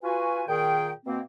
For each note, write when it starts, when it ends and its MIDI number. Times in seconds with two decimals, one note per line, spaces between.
0.03 0.42 65
0.03 0.42 66
0.03 0.42 71
0.03 0.42 80
0.48 0.91 46
0.48 0.91 51
0.48 0.91 68
0.48 0.91 79
1.05 1.19 47
1.05 1.19 58
1.05 1.19 60